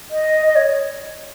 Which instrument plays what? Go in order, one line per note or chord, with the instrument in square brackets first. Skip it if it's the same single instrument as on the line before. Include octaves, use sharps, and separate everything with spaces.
[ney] D#5
D#5
C#5